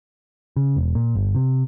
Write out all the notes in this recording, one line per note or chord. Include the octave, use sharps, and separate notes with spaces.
C#3
E1
A#2
G1
C3